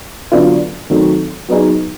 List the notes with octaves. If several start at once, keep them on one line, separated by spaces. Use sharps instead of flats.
D3 F#3 B3 D4 F4
D#3 F#3 A3 C4
F#3 B3 D#4 G#4